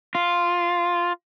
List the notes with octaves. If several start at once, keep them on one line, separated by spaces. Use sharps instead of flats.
F4